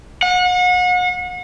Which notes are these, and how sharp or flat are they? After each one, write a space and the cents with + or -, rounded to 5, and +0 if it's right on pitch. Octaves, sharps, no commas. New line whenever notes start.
F#5 -35